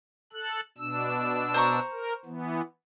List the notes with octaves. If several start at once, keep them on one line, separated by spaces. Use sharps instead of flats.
A4 F#6
B2 D4 E6
C5 A#5 C#6
A#4
E3 B3